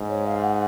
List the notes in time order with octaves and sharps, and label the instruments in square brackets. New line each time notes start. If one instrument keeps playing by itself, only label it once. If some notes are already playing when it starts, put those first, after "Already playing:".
Already playing: [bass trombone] G#2
[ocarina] C#5
F5
F#5